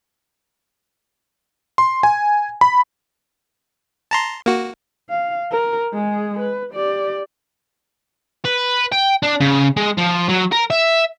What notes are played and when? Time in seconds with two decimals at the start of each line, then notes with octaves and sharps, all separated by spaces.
1.78 C6
2.03 G#5
2.61 B5
4.11 A5 A#5 C6
4.46 A#3 F#4
5.09 F5
5.51 A#4
5.93 G#3 G#4
6.40 B4
6.72 G4 D5
8.45 B4
8.92 G5
9.23 D4
9.41 C#3
9.77 G#3
9.98 F3
10.29 F#3
10.52 A#4
10.70 E5